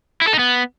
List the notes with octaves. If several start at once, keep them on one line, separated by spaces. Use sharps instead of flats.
E4
A4
D#4
B3